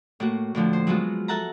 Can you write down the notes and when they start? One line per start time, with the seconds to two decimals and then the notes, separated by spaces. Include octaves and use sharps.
0.20 A2 A#3 F#4
0.55 A2 D3 F3 A3
0.73 C5
0.87 F#3 G#3 B3 F4 F#4
1.28 A4 E5 F#5 A5 A#5